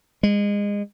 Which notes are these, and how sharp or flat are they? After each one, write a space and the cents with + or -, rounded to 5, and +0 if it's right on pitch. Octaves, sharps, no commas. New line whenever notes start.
G#3 -25